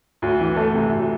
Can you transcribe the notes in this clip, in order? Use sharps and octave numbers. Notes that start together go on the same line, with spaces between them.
D2
E3
A3
C3
D2